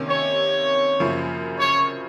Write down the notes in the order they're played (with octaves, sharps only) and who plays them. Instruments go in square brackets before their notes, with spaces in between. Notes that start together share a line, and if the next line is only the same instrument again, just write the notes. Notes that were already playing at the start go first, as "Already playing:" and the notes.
Already playing: [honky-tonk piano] C3 D#3 A#3 C#4
[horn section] C#5
[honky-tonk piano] F#2 C#3 F3 A#3
[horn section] C#5